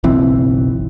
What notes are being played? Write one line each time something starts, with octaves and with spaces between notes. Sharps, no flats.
F#1 B1 E3 C4